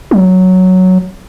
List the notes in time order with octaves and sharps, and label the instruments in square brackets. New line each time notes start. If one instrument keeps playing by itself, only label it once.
[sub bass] F#3